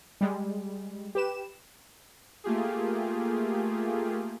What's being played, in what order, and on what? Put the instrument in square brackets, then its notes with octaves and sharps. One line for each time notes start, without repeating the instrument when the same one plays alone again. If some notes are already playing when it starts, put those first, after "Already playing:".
[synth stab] G3 G#3
G4 B4 E7
[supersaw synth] A3 A#3 F4 G4 G#4